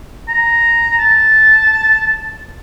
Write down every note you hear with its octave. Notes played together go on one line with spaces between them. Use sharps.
A#5
A5